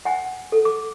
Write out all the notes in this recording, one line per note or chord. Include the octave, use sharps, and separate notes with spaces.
F#5 G#5
A4
D6